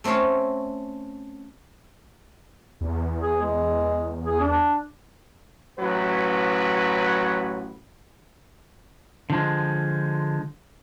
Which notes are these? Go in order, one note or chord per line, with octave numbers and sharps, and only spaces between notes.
A3 C4 C#4 C#5 F5
E2
G#4
G#3
G#4
D4
A1 F#3 B4
D3 F3 G#3